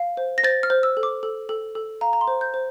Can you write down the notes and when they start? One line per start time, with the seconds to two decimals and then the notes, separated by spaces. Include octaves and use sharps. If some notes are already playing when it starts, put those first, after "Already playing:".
Already playing: F5
0.17 C5
0.38 A#6
0.44 C5 A6
0.63 F6
0.70 C5
0.83 E6
0.97 A4
1.03 D6
1.23 A4
1.49 A4
1.75 A4
2.01 F5 A#5
2.13 A#5
2.21 C6
2.28 C5
2.41 G6
2.54 C5